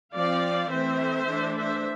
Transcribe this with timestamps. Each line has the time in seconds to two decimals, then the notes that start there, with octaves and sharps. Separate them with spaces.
0.14 F3 C4 D5 F5
0.71 E3 A3 C4 C5 E5
1.28 E3 A3 D4
1.56 C5 E5